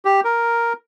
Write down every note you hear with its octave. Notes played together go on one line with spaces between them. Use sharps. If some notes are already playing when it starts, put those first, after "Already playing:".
G4
A#4